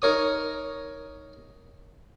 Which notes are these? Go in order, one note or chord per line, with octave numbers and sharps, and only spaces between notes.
D#4 A#4 C#5 D#6